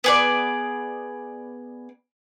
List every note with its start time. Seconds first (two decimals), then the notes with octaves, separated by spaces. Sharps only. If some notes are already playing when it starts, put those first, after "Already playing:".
0.04 B3 G#4 D5